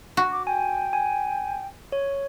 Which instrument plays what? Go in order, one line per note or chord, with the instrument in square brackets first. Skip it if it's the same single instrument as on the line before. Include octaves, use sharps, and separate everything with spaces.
[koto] F#4
[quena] D6
[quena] G5 [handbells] G#5
[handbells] G#5
C#5